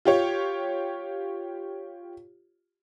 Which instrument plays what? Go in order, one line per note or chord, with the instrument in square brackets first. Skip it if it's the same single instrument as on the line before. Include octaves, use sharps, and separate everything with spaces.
[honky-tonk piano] F4 G4 C#5